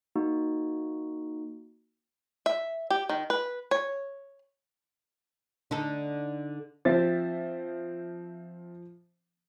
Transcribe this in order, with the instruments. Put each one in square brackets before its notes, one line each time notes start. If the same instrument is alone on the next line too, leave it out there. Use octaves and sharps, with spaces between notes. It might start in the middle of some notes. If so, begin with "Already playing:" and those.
[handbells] A#3 D#4 F#4
[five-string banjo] E5
G4
D#3
B4
C#5
[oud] D3 D#4 A4
[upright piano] F3 E5 A6 [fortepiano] C4 C5